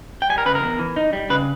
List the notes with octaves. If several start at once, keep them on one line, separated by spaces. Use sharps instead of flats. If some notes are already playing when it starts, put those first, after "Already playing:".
G5
G3 G#5
A#4
C#3 B4
A#4
E2
E3
D#4
G3
C#3 B4